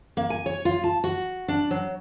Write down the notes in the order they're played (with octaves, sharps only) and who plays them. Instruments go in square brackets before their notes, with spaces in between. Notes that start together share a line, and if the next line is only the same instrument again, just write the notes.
[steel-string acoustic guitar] A#3
G#5
C#5
F4
A5
F#4
D4
F#3